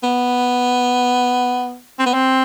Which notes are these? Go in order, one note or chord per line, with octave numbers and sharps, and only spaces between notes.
B3
C4
B3
C4